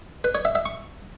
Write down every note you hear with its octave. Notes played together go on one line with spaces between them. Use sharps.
B4
C#5
E5
E5
C#6